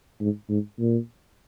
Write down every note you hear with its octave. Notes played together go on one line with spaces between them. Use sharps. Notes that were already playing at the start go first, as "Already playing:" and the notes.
G#2
G#2
A#2